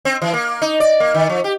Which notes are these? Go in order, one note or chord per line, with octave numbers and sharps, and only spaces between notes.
C4
E3
A#3
D#4
D5
A#3
D#3
F3
G4